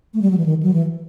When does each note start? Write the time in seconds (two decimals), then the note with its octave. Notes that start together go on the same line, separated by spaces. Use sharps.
0.14 A3
0.22 G3
0.31 F#3
0.38 E3
0.46 D#3
0.63 F#3
0.74 E3